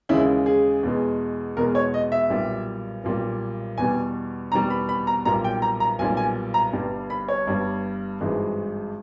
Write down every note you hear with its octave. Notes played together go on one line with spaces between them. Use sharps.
D#2 C#3 E3 G#3 E4
G#4
E2 B2 G#3
E2 B2 G#3 A#4
C#5
D#5
E5
B1 A#2 G3
B1 A#2 G3
E2 B2 G3 G#5
E2 B2 G3 A#5
B5
B5
A#5
B1 A#2 G3 A#5
G5
A#5
A#5
B1 A#2 G3 G#5
G#5
A#5
G1 G2 G3
B5
C#5
G1 G2 G3
G#1 G2 E3 G#3